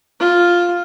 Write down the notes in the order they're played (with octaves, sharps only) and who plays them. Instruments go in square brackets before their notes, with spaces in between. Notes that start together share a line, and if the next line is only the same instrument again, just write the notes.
[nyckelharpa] F4